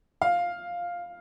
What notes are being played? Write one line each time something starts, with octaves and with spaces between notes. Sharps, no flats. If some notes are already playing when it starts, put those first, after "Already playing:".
F5